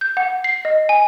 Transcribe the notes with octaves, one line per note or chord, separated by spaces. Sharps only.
G6
F#5
C7
D#5
G#5